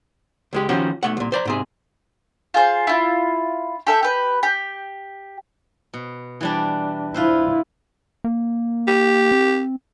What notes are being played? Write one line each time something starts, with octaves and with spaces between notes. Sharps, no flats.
C#2 G#3 G4
D#3 F3 C#4 F#4 G4
B1 A3 F#5
C2 A#2
C5 D5 A#5
G#2 C3 G#4
F4 G#4 C5
E4 F4
G4 A4 E5
G4 B4
G4
B2
E3 G3 D4
E4 F4 B4 C5
A#3
G4
C4